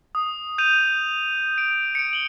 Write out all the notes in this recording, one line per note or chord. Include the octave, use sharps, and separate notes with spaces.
D#6
G6 D#7 F7
D7
C#7 D7
F#7 G7